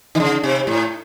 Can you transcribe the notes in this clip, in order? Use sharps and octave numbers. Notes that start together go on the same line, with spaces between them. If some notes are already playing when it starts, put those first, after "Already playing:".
D#3
C#3
C3
A2